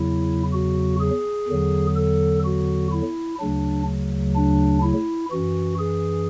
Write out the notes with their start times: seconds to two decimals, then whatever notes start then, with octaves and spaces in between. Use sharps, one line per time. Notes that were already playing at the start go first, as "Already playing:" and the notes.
Already playing: E2 C#3 F#3 E4
0.53 F#4
1.00 G#4
1.48 E2 D3 F#3
1.96 A4
2.45 F#4
2.92 E4
3.39 D2 C#3 F#3 D4
4.35 D4
4.83 E4
5.31 F#2 E3 F#4
5.79 G#4